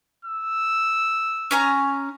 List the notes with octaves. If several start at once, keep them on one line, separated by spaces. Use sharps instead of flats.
E6
C#4 G#5 A#5